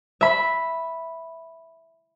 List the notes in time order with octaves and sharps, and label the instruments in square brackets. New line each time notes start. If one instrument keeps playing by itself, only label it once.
[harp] E5 B5